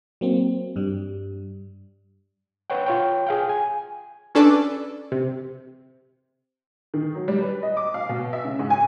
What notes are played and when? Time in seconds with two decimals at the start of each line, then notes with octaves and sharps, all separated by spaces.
0.21 F#3 A#3 C4
0.76 G2 G3
2.70 B4 C#5 F#5 G5
2.86 F4 C#5 G5
3.27 G#4 F5 G5
3.49 G#5
4.35 C#4 D4 A4 B4 D5
5.12 C3
6.94 D#3
7.15 F#3
7.28 G3
7.41 B4
7.63 D#5
7.77 D6
7.94 F5
8.09 B2
8.33 E5
8.45 C#3
8.59 G#2
8.70 G#5